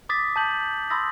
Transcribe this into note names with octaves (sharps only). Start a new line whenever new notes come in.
D6 D#6 A6 B6
A5 G6 F#7
B5 C6 D#6 E6 A6 A#6